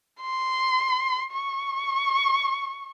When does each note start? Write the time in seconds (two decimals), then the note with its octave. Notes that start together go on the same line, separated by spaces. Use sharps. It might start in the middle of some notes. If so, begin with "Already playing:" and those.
0.21 C6
1.32 C#6